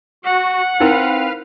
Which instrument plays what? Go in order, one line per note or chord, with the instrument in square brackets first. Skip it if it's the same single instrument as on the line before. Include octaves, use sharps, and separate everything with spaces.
[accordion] F#4 [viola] F#5
[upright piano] C4 [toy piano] D#4 E4 A#4 [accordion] B4 F5 F6